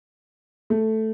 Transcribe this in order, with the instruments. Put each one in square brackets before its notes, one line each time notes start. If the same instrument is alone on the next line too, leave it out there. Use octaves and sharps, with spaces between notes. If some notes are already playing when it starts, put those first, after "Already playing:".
[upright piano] A3